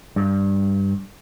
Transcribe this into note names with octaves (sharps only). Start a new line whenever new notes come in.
G2